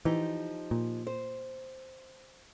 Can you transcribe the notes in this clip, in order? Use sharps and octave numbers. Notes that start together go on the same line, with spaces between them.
E3 F3 D#4 G4
A#2
C5